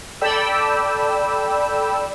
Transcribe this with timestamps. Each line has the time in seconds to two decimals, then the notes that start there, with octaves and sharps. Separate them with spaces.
0.21 A4 D5 G5 B5 E6